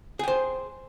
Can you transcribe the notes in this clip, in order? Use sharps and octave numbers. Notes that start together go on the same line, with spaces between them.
G#4 C5 G5